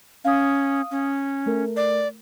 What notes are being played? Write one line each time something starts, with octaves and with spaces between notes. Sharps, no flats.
C#4 F5 D#6
C#4
A3 A#4
D5